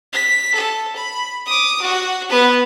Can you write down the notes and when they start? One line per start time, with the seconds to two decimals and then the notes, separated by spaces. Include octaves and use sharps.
0.13 B6
0.54 A4
0.96 B5
1.46 D6 D#6
1.81 F#4
2.29 B3 B4